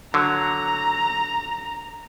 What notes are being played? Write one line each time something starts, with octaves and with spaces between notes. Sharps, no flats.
D3 F#3 A#5